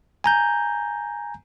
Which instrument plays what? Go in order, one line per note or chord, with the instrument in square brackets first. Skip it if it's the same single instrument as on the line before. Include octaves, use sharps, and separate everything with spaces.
[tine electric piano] G#5 A#5 G6